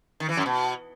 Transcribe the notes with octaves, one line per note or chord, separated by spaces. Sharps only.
D#3
E3
F#2
B2